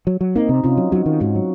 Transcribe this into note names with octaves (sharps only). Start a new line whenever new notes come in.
F#3
F#3
A#3 C4 D#4
C3
C3 C#4 F4
F#3
F#3 D#4 F#4
D#3
G#2 D#4 F#4
F#3